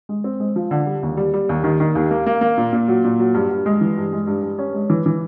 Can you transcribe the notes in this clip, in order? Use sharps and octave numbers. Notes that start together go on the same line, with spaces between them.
G#3
C4
G#3
F3
D3
G3
D#2
G3
G3
D#2
D#3
D#3
D#2
A#3
A#3
A#3
A#2
A#2
F#3
A#2
F#3
G2
G2
G#3
E3
G2
G#3
G2
G2
C#4
G#3
E3
E3